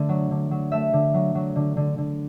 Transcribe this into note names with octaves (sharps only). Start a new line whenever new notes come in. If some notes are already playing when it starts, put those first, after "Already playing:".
Already playing: D3 A3
F#3
D3
F#3
A3 E5
D3
F#3
F#3
D3
D3
D3